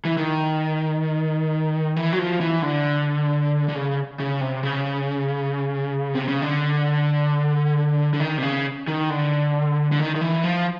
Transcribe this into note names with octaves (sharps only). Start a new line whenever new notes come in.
E3
D#3
E3
F#3
F3
E3
D3
D3
C#3
C#3
C3
C#3
C3
C#3
D3
D3
D#3
C3
C#3
D#3
D3
D3
D#3
D#3
E3
F3